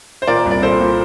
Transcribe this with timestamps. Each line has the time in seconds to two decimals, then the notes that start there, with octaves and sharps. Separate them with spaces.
0.22 C5
0.27 A#2 A#4 D5
0.46 C2
0.51 D5
0.62 A#2 A4 C5
0.81 A#2